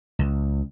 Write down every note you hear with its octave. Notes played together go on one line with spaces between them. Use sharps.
C#2